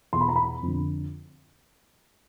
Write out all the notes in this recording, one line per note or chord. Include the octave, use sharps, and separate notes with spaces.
E2 B2 C6
B5
A#5
B5
F2 D3